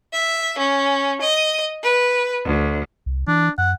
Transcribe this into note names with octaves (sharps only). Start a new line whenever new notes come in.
E5
C#4
D#5
B4
D2
C2
E3 D4
F#2 F#5